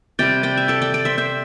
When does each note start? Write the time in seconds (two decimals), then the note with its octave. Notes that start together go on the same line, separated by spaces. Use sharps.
0.19 C3 G3 D5 G5
0.43 D5 G5
0.57 E5
0.68 A4 D5
0.81 D5 G5
0.94 D5 G5
1.05 C5 E5
1.18 C5 E5